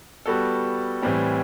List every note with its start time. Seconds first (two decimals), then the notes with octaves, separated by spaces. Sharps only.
0.26 G3 B3 F#4 A4
1.02 A2 E3 G3 C4